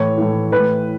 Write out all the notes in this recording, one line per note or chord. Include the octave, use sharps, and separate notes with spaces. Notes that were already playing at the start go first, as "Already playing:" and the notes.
Already playing: A2 E3 C#5
A2 E3
A2 E3 B4